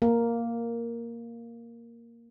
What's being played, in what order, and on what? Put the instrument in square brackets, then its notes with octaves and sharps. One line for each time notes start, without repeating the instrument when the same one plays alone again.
[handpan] A#3 A#4